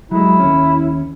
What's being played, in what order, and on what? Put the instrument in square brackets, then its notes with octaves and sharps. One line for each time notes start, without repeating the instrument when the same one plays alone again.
[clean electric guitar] F#3 G#3 [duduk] E4
[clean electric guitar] D#2 C#4